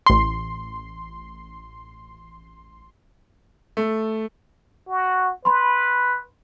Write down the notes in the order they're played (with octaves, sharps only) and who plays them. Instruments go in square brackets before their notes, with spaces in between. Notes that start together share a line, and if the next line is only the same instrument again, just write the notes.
[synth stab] A1 C6
[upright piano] A3
[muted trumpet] F#4
[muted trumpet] B4 [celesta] B5 C6